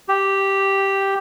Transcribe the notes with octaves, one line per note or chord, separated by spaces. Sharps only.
G4